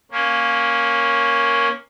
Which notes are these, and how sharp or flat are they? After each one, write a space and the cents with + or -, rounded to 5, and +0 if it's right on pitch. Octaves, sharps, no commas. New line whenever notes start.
A#3 +5 C#4 +0